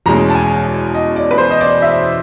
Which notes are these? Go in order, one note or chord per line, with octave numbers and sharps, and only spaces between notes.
E2 B2 G#3 C#4 A#5
A5
G#5
D#5
D5
B4
C5
D#5
D5
E5